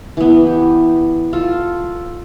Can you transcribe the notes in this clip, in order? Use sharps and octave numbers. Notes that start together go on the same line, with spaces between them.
E3 B3
G4
F4 A4